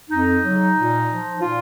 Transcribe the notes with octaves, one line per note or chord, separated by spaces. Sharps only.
F2 D#4
C#3 F#3
A#2
F3
A#2 F4